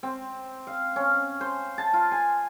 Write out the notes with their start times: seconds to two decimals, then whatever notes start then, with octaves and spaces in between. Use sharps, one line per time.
0.03 C4
0.67 F5
0.96 C#4
1.41 C5
1.78 A5
1.93 F4
2.12 G#5